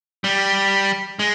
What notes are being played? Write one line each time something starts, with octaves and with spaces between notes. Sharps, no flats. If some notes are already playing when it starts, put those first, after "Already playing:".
G3
G#3